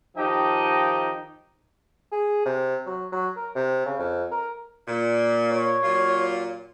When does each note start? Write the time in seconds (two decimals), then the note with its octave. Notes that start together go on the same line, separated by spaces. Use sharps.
0.17 D#3 F3 D#4 G4 D#5 G5
2.12 G#4
2.46 C3
2.87 F#3
3.12 F#3
3.36 A#4
3.55 C3
3.86 C#3
3.99 F2
4.32 A#4
4.88 A#2
5.51 C#5
5.83 A#2 F#3 F4